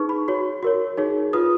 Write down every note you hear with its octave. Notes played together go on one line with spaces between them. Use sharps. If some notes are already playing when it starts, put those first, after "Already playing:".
Already playing: D#4 G#4 B4 C#6
B5
F#4 C#5
F#4 A#4 C#5
D#4 G#4 C#5
F4 B4 D#6